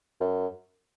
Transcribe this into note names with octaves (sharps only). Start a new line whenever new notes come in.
F#2